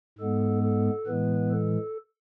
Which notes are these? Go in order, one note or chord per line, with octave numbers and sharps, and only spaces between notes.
G#2 G#3 B3 A4
A4
A2 E3 G#3 B3 B4
A4